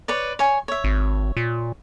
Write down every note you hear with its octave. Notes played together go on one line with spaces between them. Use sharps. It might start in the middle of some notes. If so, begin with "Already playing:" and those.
B4 C#5 D5
C#5 G#5
C#5 E5
G#1
A#2